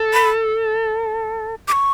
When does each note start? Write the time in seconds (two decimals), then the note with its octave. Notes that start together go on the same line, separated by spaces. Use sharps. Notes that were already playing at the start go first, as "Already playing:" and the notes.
Already playing: A4
0.13 B5
1.68 D6
1.72 C#6